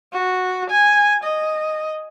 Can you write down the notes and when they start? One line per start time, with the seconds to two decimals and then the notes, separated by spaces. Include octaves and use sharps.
0.13 F#4
0.70 G#5
1.24 D#5